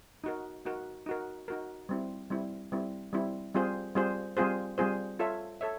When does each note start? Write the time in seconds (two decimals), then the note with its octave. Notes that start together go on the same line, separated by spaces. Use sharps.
0.24 D#4 F#4 A#4
0.65 D#4 F#4 A#4
1.06 D#4 F#4 A#4
1.48 D#4 F#4 A#4
1.89 G3 C4 E4
2.30 G3 C4 E4
2.72 G3 C4 E4
3.13 G3 C4 E4
3.54 G3 C4 F4 G#4 C5
3.95 G3 C4 F4 G#4 C5
4.37 G3 C4 F4 G#4 C5
4.78 G3 C4 F4 G#4 C5
5.20 F4 A4 C#5 E5
5.61 A4 C#5 E5